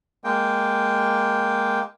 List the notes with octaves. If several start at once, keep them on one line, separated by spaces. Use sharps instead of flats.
G#3 A#3 G5